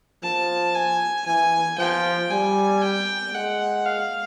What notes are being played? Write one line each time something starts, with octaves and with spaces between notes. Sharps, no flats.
F3 A5
G#5
E3 G#5
F3 G5
G3 G#5
G5
G#3 F#5
F5